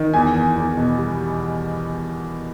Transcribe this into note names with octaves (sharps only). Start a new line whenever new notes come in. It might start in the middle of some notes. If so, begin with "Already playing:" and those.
Already playing: D#3
E2 G#5
E2
E2
B2
G3